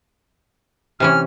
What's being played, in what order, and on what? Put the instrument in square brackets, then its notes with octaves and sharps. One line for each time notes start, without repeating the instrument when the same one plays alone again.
[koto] C3 E3 C#4 [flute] F6